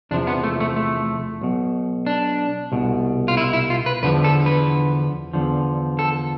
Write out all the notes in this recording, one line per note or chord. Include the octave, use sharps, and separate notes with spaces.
E2 C3 F3 D4
B3
A3
A3
A3
B1 B2
D4
C2 B2
F4
E4
E4
F4
B4
E2 D3 F3 B4
A4
B4
E2 D3 F3
A4